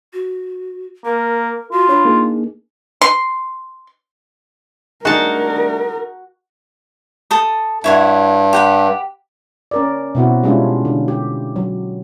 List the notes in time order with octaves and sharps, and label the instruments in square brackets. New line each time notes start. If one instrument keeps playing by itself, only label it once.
[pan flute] F#4
[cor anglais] A#3 [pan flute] A#4
[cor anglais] F4 [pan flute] F#4
[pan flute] D4 [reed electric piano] C#5 B5
[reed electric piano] A#3 D#4 G#4
[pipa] C6
[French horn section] G3 A3 D4 [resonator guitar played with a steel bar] D#4 G#4 [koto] F#4 A5 [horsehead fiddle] A#4
[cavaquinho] A4 D#6
[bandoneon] G2 [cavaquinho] E4 C#5 F#5
[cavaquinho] G4 F#5 B5
[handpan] C#4 A#4 D5
B2 C4 E4 F#4
G3 G#3 C#4 D4 E4 F4
D3
G4
F#3